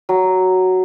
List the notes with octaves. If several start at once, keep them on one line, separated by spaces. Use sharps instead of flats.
F#3